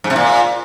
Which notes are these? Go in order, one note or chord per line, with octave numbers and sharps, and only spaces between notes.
G#2
C3
A#2